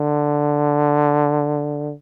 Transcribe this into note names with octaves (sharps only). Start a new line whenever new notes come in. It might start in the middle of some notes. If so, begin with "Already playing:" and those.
Already playing: D3